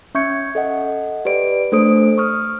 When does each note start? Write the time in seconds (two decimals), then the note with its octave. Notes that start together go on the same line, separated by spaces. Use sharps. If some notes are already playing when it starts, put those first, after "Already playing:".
0.15 C#4 E5 C#6 G6 G#6 C#7
0.55 A4 D#5 F#5
1.25 G4 B4 D5 D7
1.72 A3 D4 A4 C5 D#6 D7
2.18 C#6 D#6 F6